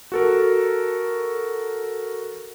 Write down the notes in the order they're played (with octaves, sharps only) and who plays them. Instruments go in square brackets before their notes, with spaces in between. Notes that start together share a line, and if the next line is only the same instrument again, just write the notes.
[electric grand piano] F#4 A4 A#4